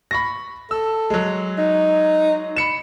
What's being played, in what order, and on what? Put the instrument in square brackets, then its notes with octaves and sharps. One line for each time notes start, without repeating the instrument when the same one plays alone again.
[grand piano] B5 C#6 A#6
[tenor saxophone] A4 [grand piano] E6
[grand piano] F#3 G#3
[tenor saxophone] D#4
[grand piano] B5 C#7 E7